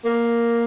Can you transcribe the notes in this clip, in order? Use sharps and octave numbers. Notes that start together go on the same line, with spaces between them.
A#3